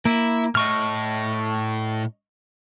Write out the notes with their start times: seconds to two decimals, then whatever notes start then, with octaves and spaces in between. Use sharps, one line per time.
0.05 A#3 E4
0.55 A2 D#5 C#6 F6